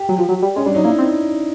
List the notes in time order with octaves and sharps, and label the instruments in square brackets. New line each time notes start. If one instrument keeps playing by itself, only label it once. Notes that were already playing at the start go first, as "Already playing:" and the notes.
Already playing: [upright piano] G4
[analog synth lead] F#3
F3
F#3
G3
[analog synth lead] G#3 [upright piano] C#4
[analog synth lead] G3 [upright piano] D4
[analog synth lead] F#3 [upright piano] D#4
[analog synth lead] A#3 [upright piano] E4
[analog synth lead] C4